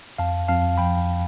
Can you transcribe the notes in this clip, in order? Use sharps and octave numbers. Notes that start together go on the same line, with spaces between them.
F2 F5 A5
F2 F5 A5
F3 G5 B5